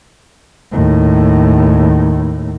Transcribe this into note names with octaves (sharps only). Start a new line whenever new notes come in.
D#2 A2